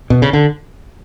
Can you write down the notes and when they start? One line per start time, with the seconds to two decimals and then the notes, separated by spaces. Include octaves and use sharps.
0.10 B2
0.22 C#3
0.33 D3